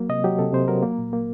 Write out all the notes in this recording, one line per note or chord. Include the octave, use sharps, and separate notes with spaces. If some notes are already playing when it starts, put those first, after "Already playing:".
Already playing: F#3 A#3
C3 D#5
F#3 G4
C3 A4
C3 C5
F#3 A#4
A#3
A#2
A#3